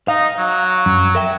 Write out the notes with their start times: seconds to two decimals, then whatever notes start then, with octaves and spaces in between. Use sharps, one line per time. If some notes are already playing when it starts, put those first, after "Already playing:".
0.08 D#4 F5
0.38 F#3
0.86 F#2
1.15 A#4 E5 G5